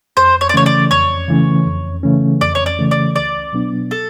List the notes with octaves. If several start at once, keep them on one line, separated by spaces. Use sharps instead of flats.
F2 C5
C#5
D5
C#3 E3 A3 C#4 C#5
D5
F2 C#5
C#3 E3 A3 C#4
F2
C#3 E3 A3 C#4
F2 D5
C#5
D5
C#3 E3 A3 C#4
D5
C#2 D5
B2 F#3 B3 D4
A4